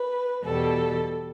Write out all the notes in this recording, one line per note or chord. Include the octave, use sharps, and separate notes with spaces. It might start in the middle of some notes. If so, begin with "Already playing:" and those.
Already playing: B4
E2 B2 G3 A4